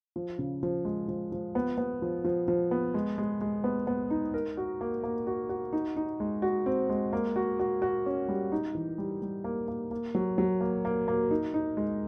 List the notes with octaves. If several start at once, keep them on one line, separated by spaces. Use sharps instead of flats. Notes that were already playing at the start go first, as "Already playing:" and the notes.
F3
C#3
F3
G#3
F3
F3
B3
B3
F3
F3
F3
B3
G#3
G#3
G#3
B3
B3
D#4
A#4
F#4
A#3
A#3
F#4
F#4
D#4
D#4
G#3
F#4
C4
G#3
A#3
F#4
F#4
F#4
C#4
G3
D#4
E3
G3
G3
A#3
A#3
A#3
F#3
F#3
A#3
A#3
A#3
D#4
D#4
G#3